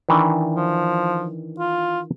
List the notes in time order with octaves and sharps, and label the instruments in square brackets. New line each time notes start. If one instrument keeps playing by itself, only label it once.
[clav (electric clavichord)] D#3 E3 D4
[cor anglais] F3
F4